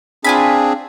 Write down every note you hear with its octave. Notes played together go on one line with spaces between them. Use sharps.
C4 D4 F4 G#4 G#5 B5